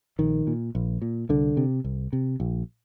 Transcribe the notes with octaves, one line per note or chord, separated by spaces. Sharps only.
A#1 D#3
A#2
A#1
A#2
C2 D3
C3
C2
C3
A#1